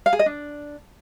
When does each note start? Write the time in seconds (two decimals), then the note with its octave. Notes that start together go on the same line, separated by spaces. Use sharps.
0.06 F5
0.13 G#4
0.19 D#5
0.26 D4